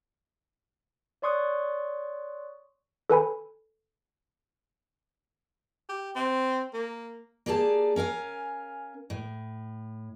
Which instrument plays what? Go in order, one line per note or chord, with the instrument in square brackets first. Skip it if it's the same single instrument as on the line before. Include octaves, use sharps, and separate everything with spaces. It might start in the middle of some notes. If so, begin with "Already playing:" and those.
[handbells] C#5 D5 C6 C#6 D#6 F#6
A4 B4 G#5 B5
[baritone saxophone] G4
C4
A#3
[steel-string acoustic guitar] A#3 G4 G#4 D5 A5
C#4 A#4 F5 G#5
A2